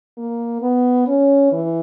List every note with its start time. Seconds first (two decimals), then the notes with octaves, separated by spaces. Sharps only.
0.18 A#3
0.62 B3
1.07 C#4
1.52 E3